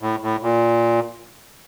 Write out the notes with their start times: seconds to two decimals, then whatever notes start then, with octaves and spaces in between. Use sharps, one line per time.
0.01 A2
0.22 A2
0.43 A#2